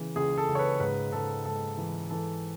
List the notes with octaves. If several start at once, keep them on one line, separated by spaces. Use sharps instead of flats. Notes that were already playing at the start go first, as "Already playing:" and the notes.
Already playing: C#3 E3
C#2 G#4
A4
C#2
C#5
B4
G#2 B4
G#2 A4
G#2 A4
E3
E3 A4